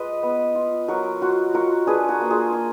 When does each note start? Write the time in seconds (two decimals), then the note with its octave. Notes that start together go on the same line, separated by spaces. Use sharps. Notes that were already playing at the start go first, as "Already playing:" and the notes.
Already playing: G#3 F4 B4 D#5
0.23 B3
0.55 F4
0.88 F#3 F#4 A#4
1.21 F4 F#4
1.54 F4 F#4 A#4
1.86 D4 G#4 B4
2.08 F#4 A#4
2.20 A#3
2.30 F4 G#4
2.52 A#3 F4